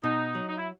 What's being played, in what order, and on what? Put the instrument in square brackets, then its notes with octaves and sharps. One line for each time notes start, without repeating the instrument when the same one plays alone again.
[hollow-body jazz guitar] B2 [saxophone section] D#4
[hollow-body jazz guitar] F#3
[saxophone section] D#4
E4